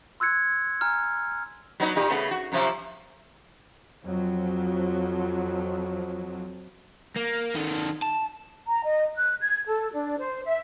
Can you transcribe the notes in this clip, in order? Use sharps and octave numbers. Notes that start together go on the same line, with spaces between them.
C6 E6 F#6 G#6 C#7
G#5 A#5 F6
F#3 B3 D#4
A#2 D#4 G4
C#3 A3 B3
F#4
F#2 C3 F3
F2 F3 F#3
A#3
D#3 A4
A5
A#5
D#5
F#6
G#6
A4
D4
C5
E5